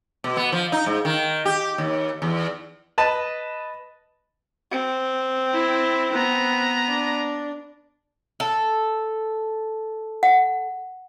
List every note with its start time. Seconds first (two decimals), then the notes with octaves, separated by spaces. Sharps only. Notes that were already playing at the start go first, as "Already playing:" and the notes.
0.24 B2
0.37 B3
0.52 F3
0.72 D#4
0.86 G#2
1.05 D#3
1.45 G4
1.78 D#2
2.22 E2
2.98 B4 D#5 A5
4.71 C4
5.53 E4
6.12 B3 A#5
6.88 D4
8.40 A4
10.23 F#5